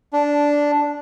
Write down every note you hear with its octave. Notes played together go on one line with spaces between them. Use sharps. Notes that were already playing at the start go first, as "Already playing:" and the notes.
D4